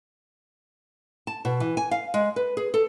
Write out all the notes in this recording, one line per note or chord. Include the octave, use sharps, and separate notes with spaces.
A5
B2
E3
G#5
F5
G#3
B4
G#4
A4